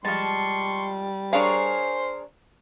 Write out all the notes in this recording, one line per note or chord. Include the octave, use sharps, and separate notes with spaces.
F3 G3 G#3 A5 C6 C#6
D4 G#4 A#4 C5 C#5 F5